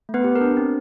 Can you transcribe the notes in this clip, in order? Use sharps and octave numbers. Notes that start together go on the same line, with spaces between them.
A3
B3 B4
G4
A#4
D4
C4